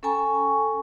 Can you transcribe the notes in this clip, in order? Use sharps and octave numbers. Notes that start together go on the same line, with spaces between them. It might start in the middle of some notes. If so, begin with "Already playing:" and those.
C#4 A4 G5 G#5 A#5 C#6